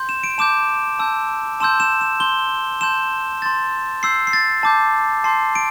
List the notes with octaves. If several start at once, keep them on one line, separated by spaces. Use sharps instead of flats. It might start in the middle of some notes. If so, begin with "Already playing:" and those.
Already playing: C6 G6
E7
D7
A5 D6 G6 E7
A5 E6 G6
A5 C6 E6 G6 E7
E7
E7
C6 G6 G7
A5 C6 G6 E7
C6 G6 A6
C6 E6 G6 C7
C7
A6
A5 D6 G6
A5 C6 G6 C7
D7